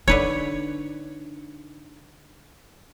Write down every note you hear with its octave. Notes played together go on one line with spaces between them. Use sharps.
D3 D4 D#4 B4 C#5